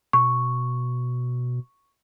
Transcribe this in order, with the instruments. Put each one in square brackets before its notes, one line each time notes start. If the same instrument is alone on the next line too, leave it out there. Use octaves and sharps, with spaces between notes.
[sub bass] B2 [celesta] C#6